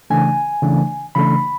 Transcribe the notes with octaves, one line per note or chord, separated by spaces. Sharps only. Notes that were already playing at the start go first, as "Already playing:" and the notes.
C#3 E3 A3 D4 G#5
C#3 E3 A3 D4
C#3 E3 A3 D4 B5